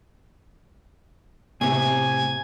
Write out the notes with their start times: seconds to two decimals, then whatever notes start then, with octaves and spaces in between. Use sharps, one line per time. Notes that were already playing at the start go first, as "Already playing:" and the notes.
1.61 A2 C3 G#5